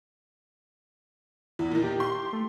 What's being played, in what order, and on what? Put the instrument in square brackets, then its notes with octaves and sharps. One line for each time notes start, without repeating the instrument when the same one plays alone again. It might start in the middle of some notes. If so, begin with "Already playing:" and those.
[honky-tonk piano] E2 [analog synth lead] E4
[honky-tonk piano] A#2 D#3
[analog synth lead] G4
[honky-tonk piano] C6
[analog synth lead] A3